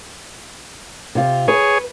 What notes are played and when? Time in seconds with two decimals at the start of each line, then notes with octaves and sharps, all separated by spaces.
1.15 C3 F4
1.48 G#4 B4 C#5